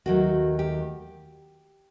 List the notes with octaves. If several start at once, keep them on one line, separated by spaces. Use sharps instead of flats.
D#2 D#3 F#3 A3 F#4
G4